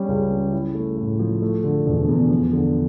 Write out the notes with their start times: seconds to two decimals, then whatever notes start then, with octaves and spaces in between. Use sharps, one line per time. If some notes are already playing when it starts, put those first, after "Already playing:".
Already playing: G3 C#4
0.08 C#2
0.31 C#3
0.53 E4
0.75 A3
0.97 A2
1.19 F3
1.42 A3
1.64 D3
1.86 E1
2.08 E2
2.30 F3
2.53 D3